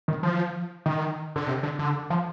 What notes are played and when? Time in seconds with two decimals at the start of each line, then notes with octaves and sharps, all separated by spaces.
0.08 D#3
0.23 F3
0.86 D#3
1.36 D3
1.47 C3
1.63 D3
1.79 D3
2.10 F3